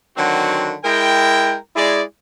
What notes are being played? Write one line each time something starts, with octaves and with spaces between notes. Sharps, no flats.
D3 D#3 F#3 C4 F#4
G#3 E4 A#4 G5
G#3 E4 G#4 D5